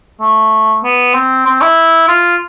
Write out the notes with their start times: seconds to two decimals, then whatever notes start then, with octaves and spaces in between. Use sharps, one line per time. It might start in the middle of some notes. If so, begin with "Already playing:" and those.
0.21 A3
0.84 B3
1.15 C4
1.46 C4
1.62 E4
2.08 F4